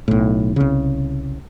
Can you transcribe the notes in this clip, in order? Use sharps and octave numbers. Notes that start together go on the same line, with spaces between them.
B1 A2
C2 C#3